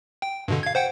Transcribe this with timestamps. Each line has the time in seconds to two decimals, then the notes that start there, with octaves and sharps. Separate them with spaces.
0.22 G5
0.48 G2 B2 D3
0.63 F5 G#6
0.75 C5 F#5 G5